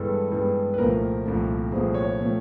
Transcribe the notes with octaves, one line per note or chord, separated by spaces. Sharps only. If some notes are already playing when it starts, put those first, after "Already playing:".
Already playing: G2 E3 G#3 B3 A4
G2 E3 G#3 B3
B4
C2 A#2 F3 A3 C4 A#4
C2 A#2 F3 A3 C4
C2 A#2 F3 A3 C4 G#4
C#5
A#2 F3 A3 C4